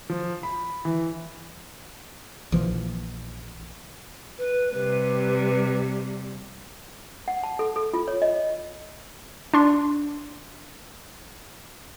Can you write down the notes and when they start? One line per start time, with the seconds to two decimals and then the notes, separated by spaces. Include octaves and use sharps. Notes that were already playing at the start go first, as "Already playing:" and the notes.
0.10 F3
0.43 B5
0.85 E3
2.52 A#1 E3 F3
4.38 B4
4.71 C3 G3 B4
7.28 F#5
7.44 A5
7.59 A4
7.76 A4
7.94 F4
8.08 C#5
8.22 D#5
9.54 D4 C6